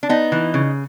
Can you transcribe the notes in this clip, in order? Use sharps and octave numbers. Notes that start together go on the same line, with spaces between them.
D4
B3 D#4
E3
C#3